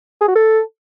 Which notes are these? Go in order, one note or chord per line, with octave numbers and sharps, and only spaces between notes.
G#4
F#4
A4